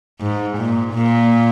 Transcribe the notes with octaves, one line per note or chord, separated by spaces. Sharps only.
G#2
A#2
A#2